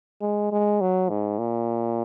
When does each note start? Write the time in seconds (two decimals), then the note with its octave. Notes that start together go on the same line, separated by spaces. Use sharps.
0.22 G#3
0.52 G#3
0.81 F#3
1.09 G#2
1.39 A#2